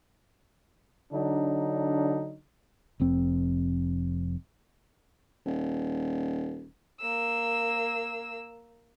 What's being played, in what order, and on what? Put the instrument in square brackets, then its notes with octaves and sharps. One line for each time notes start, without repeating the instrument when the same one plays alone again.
[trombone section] D3 F#3 D4 D#4
[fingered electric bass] F1 F2 C4
[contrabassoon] D#1
[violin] A#3 E6